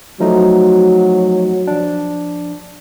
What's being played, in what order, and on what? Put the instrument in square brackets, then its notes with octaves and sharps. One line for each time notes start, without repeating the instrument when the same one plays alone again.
[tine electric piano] F3 A3 D#4 [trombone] F#3
[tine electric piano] F3 D4